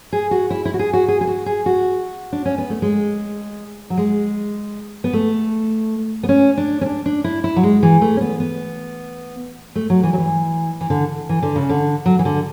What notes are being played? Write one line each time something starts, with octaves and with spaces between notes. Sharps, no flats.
G#4
F#4
E4
E4
F#4
G#4
F#4
G#4
G#4
F#4
G#4
F#4
D4
C#4
B3
A3
G#3
F#3
G#3
B3
A3
B3
C#4
D4
C#4
D4
D4
E4
E4
F#3
G#3
E3
A3
C#4
B3
B3
A3
F#3
E3
F#3
E3
E3
D3
E3
D3
C#3
D3
F#3
E3
D3